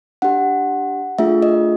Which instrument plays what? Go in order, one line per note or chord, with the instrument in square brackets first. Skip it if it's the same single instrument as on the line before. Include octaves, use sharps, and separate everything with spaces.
[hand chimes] D4 G4 F#5
A3 D4 F4 G#4 E5
D#5